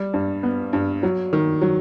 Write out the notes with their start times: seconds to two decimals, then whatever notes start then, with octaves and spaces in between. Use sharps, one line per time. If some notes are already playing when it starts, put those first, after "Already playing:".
Already playing: G3
0.13 G2
0.43 B3
0.73 G2
1.03 F#3
1.33 D#3
1.62 F#3